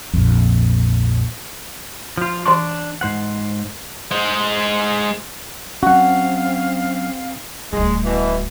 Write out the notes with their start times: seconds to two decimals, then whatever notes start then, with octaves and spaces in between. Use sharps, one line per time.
0.13 A#1 F2
2.17 F3 F4
2.46 E3 D4 C6 C#6
3.01 G#2 C5 F#5
4.11 G#3 C5
5.83 F#3 C4 C#4 F#4 F5 F#5
7.73 D1 G3 G#3
8.05 B2 E3